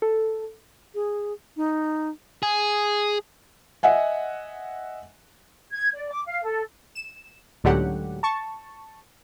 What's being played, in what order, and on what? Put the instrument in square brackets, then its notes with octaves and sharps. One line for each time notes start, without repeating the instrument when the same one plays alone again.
[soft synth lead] A4
[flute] G#4
D#4
[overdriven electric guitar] G#4
[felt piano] D#5 E5 F#5 G#5
[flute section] G#6
D5
D6
F5
A4
[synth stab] E7
C#2 A2 D3 F#3 G4 F#5
A5 C#6